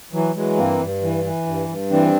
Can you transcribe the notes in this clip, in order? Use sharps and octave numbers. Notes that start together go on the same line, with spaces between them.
E3 F#3
E3 F#3 G#3
G2 A#3 C4
G2
E3
E3
G2
G2
E3 C4 D4